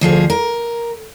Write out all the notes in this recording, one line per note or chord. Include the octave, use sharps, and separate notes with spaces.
D2 F3 G#4
A#4